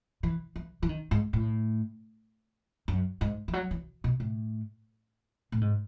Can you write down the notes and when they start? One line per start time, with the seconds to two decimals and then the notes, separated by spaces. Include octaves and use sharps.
0.23 E3
0.56 E3
0.83 E3
0.89 D#3
1.11 G#2
1.33 A2
2.88 F#2
3.21 G#2
3.48 E3
3.53 F#3
3.71 E3
4.04 B2
4.20 A2
5.52 A2
5.61 G#2